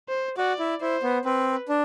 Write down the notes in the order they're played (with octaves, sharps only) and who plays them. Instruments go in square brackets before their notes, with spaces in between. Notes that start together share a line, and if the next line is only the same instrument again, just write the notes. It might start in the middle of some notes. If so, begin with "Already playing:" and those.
[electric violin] C5
[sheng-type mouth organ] F#4 [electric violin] D5
[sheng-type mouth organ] E4
[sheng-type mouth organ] E4 [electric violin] C5
[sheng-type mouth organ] B3
[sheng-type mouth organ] C4 [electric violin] B4
[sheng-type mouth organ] D4